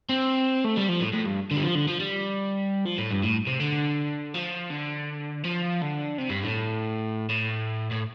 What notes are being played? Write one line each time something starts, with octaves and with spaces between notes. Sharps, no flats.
C4
A3
G3
F3
A2
A2
G2
D3
G3
F3
D3
F3
G3
F3
A2
G2
A2
C3
D3
F3
D3
F3
D3
C3
G2
A2
A2
A2